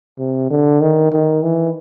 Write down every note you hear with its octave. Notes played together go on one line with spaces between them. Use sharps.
C3
D3
D#3
D#3
E3